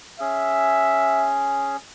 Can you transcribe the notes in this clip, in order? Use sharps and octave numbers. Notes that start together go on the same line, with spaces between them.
C#4 G#4 E5